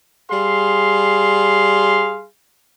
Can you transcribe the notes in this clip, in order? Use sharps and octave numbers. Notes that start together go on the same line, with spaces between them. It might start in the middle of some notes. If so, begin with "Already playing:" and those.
G3 G#4 F5 C6